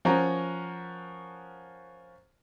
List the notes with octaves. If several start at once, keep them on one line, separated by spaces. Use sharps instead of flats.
F3 C#4 F#4 A#4